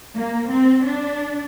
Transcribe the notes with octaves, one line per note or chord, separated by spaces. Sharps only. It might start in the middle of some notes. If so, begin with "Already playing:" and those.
A#3
C4
D4